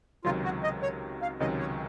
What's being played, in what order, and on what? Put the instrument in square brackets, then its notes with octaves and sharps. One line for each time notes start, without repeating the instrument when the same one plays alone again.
[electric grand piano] C#2 C3 D#3 F#3 [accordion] F4
[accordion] F#4
D#5
C#5
F5
[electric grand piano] C#2 C3 D#3 F#3 C#4 [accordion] D#5
[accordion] C#5